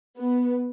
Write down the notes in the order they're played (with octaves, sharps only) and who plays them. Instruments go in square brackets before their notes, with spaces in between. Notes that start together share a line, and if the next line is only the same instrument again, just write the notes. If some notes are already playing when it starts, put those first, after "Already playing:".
[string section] B3